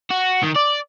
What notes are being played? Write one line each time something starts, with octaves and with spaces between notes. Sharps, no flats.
F#4
D#3
D5